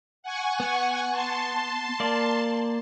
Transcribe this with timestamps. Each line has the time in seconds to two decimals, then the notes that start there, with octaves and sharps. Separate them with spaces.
0.23 F#5 G#5 C#6
0.60 B3
1.11 A5 C6
2.00 A#3 D5